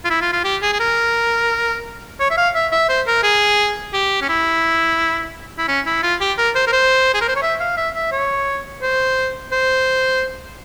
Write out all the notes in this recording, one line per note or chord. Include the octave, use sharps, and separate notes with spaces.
F4
E4
F4
F4
G4
G#4
G#4
A#4
C#5
E5
F5
E5
E5
C5
A#4
G#4
G4
C#4
E4
E4
C#4
E4
F4
G4
A#4
C5
A#4
C5
G#4
A#4
C5
C#5
E5
F5
E5
E5
C#5
C5
C5